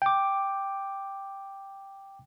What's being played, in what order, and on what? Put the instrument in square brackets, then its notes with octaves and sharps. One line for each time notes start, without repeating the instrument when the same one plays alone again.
[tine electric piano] G5 D6